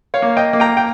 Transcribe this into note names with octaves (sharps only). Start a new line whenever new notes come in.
C#5 F5
A#3
D#5 G5
A#3
G5 A#5
G5